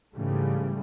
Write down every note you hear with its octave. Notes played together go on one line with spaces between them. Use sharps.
G#2 C#3 E3 G3 A3